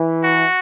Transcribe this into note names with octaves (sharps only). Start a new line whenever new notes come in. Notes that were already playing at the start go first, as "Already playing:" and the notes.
Already playing: E3
F#4